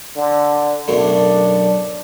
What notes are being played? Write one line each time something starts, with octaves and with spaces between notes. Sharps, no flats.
D3
B1 F#2 A2 D4